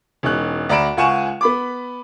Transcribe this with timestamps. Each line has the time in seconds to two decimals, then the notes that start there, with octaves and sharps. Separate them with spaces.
0.23 E1 C#4 D#4 F#6
0.69 D2 D5 A#5 B5 D7 E7
0.97 C#2 F5 F#5 G#5 C#6 E7
1.41 B3 B5 D6